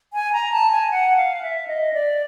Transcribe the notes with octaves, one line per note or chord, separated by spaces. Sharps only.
G#5
A#5
A5
G#5
F#5
F5
E5
D#5
D5